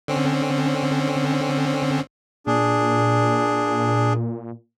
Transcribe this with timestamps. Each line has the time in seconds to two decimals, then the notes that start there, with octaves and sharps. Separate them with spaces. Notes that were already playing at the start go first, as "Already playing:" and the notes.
0.08 D3 C4 C#4
2.47 A#2 D4 G#4